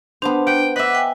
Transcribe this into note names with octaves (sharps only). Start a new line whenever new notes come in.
B3 D4 C5 A5
F#5 G5
B4 D#5 E5 F#5 D6
G5 G#5